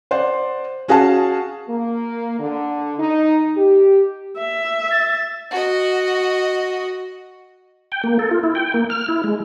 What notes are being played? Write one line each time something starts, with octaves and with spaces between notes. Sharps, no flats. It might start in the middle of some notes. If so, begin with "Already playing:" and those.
C5 D5 F#5
C#4 F#4 G#4 F5 F#5 A5
A#3
D3
D#4
G4
E5
A6
F#4 D#5
G5
A#3
A4
F4
E4
G5
A#3
F6
E4
G#3